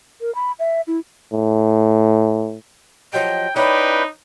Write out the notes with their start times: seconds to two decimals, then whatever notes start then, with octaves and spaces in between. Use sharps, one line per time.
0.21 A#4
0.35 B5
0.59 E5
0.87 E4
1.33 A2
3.13 F3 F#3 G4 D#5 G5
3.56 C#4 D#4 E4 B4 D5 G5 B5